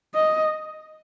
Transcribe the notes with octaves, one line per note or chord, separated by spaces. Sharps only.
D#5